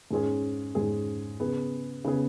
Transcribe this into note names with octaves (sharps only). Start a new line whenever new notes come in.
G#2 G#3 C#4 G#4
G#2 G#3 C#4 G#4
C#3 B3 G#4
C#3 B3 G#4